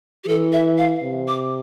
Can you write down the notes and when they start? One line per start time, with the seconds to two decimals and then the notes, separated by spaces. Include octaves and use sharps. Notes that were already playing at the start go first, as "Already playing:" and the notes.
0.24 G4
0.27 E3 A4
0.52 E5
0.78 F5
1.03 C3
1.28 D6